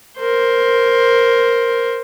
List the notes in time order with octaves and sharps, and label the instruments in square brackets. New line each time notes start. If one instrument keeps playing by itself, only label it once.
[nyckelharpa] A#4 C5